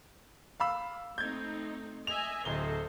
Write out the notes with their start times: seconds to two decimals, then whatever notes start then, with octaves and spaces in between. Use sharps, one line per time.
0.60 F5 B5 E6
1.18 A3 C4 D#4 G6 G#6
2.07 D#5 E5 G#5 F7
2.45 D1 A4 C5 D#5 G7